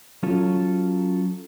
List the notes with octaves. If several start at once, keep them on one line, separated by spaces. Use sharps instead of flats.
F#3 C#4 F4 A4 C#5